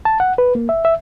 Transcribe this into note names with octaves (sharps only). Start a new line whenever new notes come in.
A5
F#5
B4
A#3
E5
E5